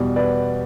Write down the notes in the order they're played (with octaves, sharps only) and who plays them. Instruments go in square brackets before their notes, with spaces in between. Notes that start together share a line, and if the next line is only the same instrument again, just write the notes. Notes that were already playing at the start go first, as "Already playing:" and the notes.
Already playing: [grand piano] E2 B2 G3
B4 D5